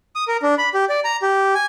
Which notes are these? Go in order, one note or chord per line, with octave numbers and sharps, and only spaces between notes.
D#6
A#4
D4
B5
G4
D5
A#5
G4
G#5